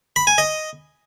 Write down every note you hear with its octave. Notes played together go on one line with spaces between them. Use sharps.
B5
G#5
D#5